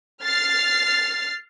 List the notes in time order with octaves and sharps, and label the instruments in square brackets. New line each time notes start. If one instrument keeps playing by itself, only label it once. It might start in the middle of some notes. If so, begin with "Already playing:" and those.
[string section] F6 A6 C7